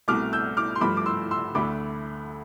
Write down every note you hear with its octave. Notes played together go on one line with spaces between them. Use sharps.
C2 B2 A3 D6 F6
E6 G6
D6 F6
C6
G2 F3 A3 B5 D6
D6
C6 E6
C6 E6
D2 D3 A3 B5 D6